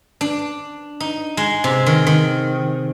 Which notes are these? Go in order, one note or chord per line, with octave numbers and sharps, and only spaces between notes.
D4
D#4
G#3
C3
D#3
D#3